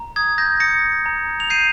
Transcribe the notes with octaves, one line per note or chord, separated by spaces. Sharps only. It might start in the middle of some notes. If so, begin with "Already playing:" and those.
Already playing: A#5
D#6 G#6
G6 A#6
D#6 A#6 C#7
A#5
F7
G6 C7 D#7